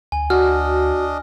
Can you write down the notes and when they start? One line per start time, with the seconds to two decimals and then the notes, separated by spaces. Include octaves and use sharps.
0.12 D2 G#5
0.30 D4 F#4 D#5 F6